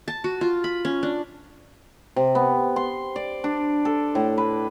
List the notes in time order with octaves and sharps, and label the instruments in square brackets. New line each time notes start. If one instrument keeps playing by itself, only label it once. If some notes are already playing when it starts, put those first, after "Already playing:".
[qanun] A5
F#4
F4
B5
C#4
D4
[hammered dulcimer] C3
B3
C6
D5
D4
A4
A2
B4